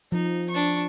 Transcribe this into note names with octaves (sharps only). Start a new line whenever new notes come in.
F3 D#4
D4 C#6